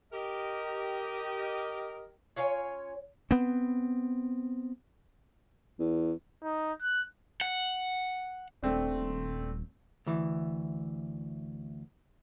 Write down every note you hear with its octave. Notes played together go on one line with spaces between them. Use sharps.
G4 A#4 D#5
C#4 F4 C#5 G#5
B3 C4
E2
D#4
F#6
F#5
D#1 A3 C4 D4
D2 E3